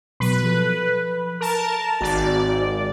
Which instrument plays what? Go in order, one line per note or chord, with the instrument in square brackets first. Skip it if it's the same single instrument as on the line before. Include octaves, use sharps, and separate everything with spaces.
[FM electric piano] B2 F#3 [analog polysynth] B4
[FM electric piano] F3 A4
[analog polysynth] A#4 A5
[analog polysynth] G#1 D5 [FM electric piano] F#4